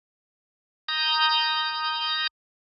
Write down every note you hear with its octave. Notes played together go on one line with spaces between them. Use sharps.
A#5 D#6 G6